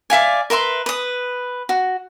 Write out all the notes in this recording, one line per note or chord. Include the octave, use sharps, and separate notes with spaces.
D5 E5 F5 G#5
A#4 B4 E5 C6
B4 D#6
F#4